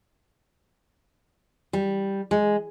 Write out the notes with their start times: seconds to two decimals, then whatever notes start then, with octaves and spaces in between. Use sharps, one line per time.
1.73 G3
2.31 G#3